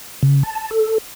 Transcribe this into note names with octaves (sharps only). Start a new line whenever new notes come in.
C#3
A5
A4